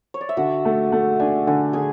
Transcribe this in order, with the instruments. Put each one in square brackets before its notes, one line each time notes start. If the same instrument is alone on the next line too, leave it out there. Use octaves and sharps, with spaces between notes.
[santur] C#5
D5
E5
[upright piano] D3 [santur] F#4 F#5
[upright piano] A3
A3
[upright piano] D4 [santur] G#5
[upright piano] D3 [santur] G#5
[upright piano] D3 [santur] G#4 G#5